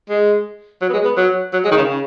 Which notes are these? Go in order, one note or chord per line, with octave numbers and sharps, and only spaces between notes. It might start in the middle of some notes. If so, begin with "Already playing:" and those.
G#3
F#3
B3
G#3
B3
F#3
F#3
G#3
D#3
C#3
C#3